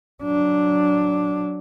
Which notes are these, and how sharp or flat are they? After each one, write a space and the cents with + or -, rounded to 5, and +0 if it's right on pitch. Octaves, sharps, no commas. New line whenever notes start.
F#3 +0 D4 -5